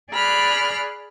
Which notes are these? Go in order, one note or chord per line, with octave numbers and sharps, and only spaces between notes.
G#4 D5 B5 F6 F#6